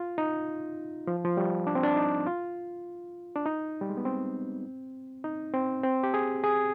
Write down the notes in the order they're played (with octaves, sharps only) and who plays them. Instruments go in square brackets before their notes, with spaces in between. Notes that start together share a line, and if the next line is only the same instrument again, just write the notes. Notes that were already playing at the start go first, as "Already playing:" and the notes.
Already playing: [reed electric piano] F4
D#4
F3
F3
G3
D4
C4
D4
D#4
F4
D4
D#4
G3
G#3
B3
C4
D#4
C4
C4
G4
G#4
G#4